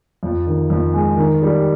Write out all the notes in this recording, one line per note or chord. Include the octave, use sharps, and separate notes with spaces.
F2
D#3
F2
G#3
D#3
G3